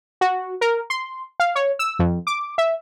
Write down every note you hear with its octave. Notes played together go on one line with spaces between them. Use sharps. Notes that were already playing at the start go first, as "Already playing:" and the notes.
F#4
A#4
C6
F5
C#5
E6
F2
D6
E5